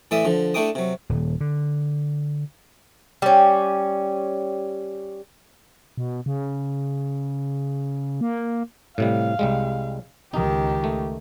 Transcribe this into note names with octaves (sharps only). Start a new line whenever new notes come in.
A2 E3 D5 E5 D#6
D3 F3
A3 D4 E4 G5 D6 D#6
C3 F#3
D#1
D3
G3 C#4
B2
C#3
A#3
A2 C3 G3 F5
C2 G3 G#3
C#2 D#3 D#4 G4
A3